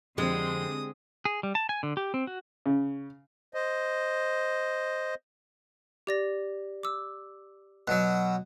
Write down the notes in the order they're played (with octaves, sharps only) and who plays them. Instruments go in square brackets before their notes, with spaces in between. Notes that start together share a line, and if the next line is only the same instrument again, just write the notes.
[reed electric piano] F2 F3 [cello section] D3 C4 [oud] G3 G#3 [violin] D#6
[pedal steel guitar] G#4
G3
A5
G#5
D3
G4
C4
F#4
[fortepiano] C#3
[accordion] C5 D#5
[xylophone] G4 D5 A#6
D6 E6
[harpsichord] B2 F#3 [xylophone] F#6